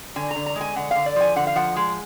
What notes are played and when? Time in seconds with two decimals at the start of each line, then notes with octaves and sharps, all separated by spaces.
0.16 D3 G#5
0.31 A#5
0.36 D3
0.46 A#5
0.56 G#3
0.61 G#5
0.76 D3 F#5
0.91 D3 F5
1.06 D5
1.16 F3 G#5
1.36 D3 F#5
1.47 F5
1.56 F3 F#5
1.76 G#3